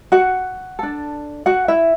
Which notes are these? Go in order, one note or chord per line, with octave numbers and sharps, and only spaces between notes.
F#4 F#5
D4 A4
F#4 F#5
E4 E5